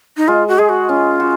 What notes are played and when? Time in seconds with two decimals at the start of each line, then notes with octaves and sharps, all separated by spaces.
0.17 D#4
0.28 G#3 F4
0.48 F#4
0.59 G#3 G#4
0.69 F#4
0.89 C#4 F4
1.20 F#4